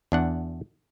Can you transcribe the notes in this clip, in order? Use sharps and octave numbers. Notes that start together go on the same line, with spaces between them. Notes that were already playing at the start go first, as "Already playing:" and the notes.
E2 D4 F#5